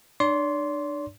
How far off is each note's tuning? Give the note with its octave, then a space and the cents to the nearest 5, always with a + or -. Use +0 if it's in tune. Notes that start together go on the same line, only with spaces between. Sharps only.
D4 +35 D5 -45 C6 +0